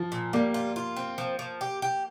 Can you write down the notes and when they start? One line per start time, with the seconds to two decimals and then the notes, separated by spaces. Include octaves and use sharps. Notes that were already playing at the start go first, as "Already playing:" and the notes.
Already playing: F3
0.12 A#2
0.33 G3 A#3
0.54 F4
0.76 F4
0.97 C4
1.18 F3
1.39 F3
1.61 G4
1.82 G4